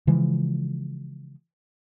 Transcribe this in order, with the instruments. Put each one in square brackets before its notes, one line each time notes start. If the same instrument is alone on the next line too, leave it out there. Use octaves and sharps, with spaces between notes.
[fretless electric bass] C#3 E3 F3 G#3